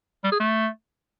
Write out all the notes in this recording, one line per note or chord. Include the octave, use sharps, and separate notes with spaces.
G3
G#4
A3